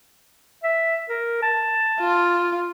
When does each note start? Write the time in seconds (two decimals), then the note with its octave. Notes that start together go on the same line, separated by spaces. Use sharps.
0.63 E5
1.09 A#4
1.42 A5
2.00 F4